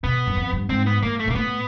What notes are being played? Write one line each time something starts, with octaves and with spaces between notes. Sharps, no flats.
B2 B3
F#2
F2
G2
G#2 C4
B3
A2 A#3
A3
A#2
A#3
A2 B3